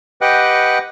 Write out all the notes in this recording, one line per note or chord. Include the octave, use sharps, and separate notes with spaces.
G4 B4 D#5 F#5 G5 F#6